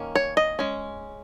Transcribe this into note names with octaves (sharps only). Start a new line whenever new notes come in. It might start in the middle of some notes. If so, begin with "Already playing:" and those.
Already playing: D#3 A#3 C#4
C#5
D#5
G#3 C#4